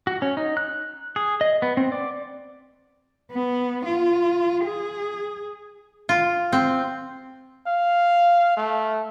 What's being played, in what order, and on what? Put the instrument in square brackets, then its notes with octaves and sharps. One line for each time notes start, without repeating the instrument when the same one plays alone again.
[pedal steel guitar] F#4
C#4
D#4
F#6
G#4
D#5
B3
C4
D5
[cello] B3
F4
G#4
[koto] F4
C4
[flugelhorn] F5
A3